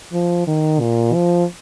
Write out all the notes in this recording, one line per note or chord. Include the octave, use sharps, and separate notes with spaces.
F3
D#3
A#2
F3